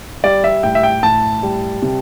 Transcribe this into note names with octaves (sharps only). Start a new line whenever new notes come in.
G3 D5
E5
A2 G5
E5
G5
A2 A5
G3
C3